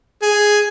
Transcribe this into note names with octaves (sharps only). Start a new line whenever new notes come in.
G#4